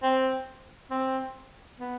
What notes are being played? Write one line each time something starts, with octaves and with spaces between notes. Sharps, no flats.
C4
C4
B3